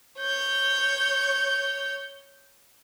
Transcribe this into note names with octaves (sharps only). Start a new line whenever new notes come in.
C#5 G6